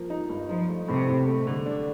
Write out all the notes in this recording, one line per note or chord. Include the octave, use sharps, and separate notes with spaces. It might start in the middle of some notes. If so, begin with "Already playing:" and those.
Already playing: F3 A#3
D#4
G2
F3 D#4
A3
A2 C3
A2
A3
D3
D4